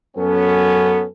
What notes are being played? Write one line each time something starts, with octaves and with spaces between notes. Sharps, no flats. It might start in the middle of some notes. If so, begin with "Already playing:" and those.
F#2 B3 C#4 A4